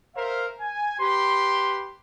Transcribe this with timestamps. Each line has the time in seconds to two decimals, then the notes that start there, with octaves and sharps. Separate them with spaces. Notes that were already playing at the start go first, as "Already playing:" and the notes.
0.15 A#4 C5 E5 F5
0.60 G#5
0.98 G4 B4 C6